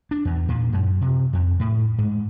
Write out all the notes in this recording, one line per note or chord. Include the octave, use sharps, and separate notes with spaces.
D4
E2
A#2
F#2
C3
F2
A2
G#2